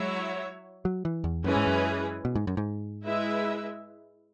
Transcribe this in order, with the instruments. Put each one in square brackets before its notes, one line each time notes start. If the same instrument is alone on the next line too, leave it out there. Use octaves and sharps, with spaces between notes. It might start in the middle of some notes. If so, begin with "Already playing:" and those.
Already playing: [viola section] F#3 E4 C#5 E5 [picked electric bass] G#3
[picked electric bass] F#3
E3
E2
[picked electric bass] F#2 [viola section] E3 G#3 C#4 G#4 B4
[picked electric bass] G#2
F#2
B2
G#2
F#2
G#2
[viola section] G#3 E4 B4 E5